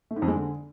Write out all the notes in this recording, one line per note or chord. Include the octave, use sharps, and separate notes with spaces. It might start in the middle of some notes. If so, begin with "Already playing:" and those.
A3
G#2
F2
G#3
D3